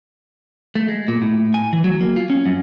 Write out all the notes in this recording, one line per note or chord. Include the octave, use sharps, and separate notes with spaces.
A3
G#3
A#2
A2
G#5
E3
F#3
A#3
F4
C#4
F#2